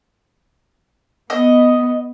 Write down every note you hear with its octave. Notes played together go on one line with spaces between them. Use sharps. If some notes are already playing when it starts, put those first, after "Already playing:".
B3 D#5